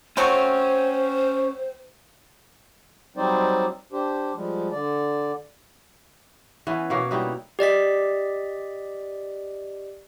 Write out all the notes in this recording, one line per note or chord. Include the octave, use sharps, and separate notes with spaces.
F#3 A3 C4 C#4 C5
F#3 G3 C4 D#4 C5 D5
D4 G4 C5
F3 G3 G#3
D3 D5
E3 B3 C#4
B2 A#3 C#5
G3 D#4 E4 F#4
G4 D5 D#5 B6